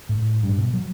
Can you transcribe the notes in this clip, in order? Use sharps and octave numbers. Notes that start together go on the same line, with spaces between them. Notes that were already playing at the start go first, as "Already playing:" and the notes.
A2
G2
B2
F#3